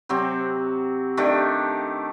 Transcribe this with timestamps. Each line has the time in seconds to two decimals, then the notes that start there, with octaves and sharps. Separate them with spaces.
0.09 C3 F#3 C4 G4
1.17 D#3 A3 D4 G4